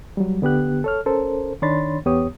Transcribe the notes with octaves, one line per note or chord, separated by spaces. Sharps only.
F#3 G3
D3 B3 G4 F#6
A4 C#5 F6
C#4 A4 A#4 C5
D#3 D4 C#5 B5 C6 A6
E2 B3 G4 C#5 D#6